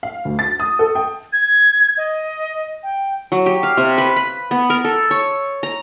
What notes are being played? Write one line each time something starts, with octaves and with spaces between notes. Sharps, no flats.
F5
D2
A6
D#6
A4
G5
G#6
D#5
G5
F#3
G4
F5
C3
B4
B5
B3
A#4
A4
C#5
A#5